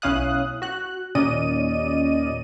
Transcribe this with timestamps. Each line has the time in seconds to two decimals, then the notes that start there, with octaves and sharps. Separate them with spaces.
0.02 B1 C#4 E4 F5 D#6 F#6
0.62 F#4 F#6
1.15 D#2 A#2 C#4 D5 D#5 D#7